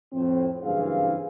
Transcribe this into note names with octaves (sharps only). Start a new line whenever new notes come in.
F2 A2 C4
F#1 G2 E3 C4 G#4 F5